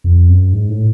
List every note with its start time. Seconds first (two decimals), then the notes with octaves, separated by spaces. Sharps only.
0.04 F2
0.29 F#2
0.53 G#2
0.69 A2